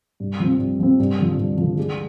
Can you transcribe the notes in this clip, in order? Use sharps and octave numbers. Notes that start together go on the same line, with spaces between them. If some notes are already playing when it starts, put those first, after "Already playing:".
G2
F3 C4
G2
F3 C4
G2
D3 F3
G2
D3 F3
G#3